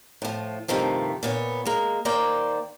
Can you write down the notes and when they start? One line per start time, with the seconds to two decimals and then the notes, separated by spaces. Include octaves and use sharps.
0.22 A2 F3
0.68 G2 C3 D#3 F3 A3
1.23 A#2 B3 C#5
1.65 G#3 A#3
2.05 D#3 A#3 C5 D5 G5